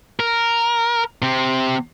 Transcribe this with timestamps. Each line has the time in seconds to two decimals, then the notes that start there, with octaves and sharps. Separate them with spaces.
0.20 A#4
1.22 C3 C4